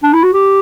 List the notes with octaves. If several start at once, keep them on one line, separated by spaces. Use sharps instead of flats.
D4
E4
F#4
G4